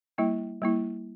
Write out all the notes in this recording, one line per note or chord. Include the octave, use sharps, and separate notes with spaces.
G3 A#3 E4 G5
G3 A#3 E4